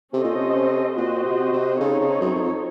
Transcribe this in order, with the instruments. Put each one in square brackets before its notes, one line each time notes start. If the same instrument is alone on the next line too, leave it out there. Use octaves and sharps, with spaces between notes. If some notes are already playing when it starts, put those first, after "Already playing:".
[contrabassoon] C3 [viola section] C#4 A4 C5 D#5
[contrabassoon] A#2
C3
[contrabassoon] A#2 [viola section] C4 F#4 C5 D#5
[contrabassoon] C3
C3
[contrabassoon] C#3 [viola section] C4 D#4 A4 C#5
[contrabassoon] C#3
F#2
F#2
F2